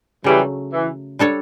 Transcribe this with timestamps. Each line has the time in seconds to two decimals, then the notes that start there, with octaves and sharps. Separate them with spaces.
0.24 C#3 E3 F#3 G3 A3
0.73 E3
1.19 G3 D4 A4 C#5